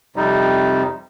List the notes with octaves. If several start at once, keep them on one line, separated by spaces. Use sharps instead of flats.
F2 C3 G3 D#4